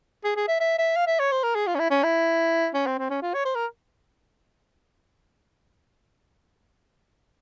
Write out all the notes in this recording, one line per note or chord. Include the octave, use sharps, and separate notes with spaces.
G#4
G#4
E5
E5
E5
F5
E5
C#5
C5
A#4
G#4
F4
C#4
E4
C#4
E4
C#4
C4
C4
C#4
F4
C#5
C5
A#4